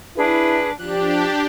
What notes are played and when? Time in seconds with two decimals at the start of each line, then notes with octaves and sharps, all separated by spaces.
0.16 D4 E4 G#4 B4
0.78 F3 D4 G4 F#6